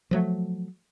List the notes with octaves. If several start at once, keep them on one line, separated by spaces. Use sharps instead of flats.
F3 F#3 A3